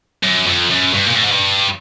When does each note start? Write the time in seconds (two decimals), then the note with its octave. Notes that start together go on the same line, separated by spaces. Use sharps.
0.23 F#2
0.47 F2
0.71 F#2
0.94 G2
1.07 A#2
1.16 A2
1.24 G#2
1.32 G2